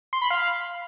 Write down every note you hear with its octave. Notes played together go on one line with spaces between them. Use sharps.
C6
B5
F5